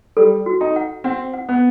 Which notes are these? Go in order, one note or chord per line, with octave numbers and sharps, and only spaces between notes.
G3 A4
F#4
D#4
F#5
C4 F#5
F#5
B3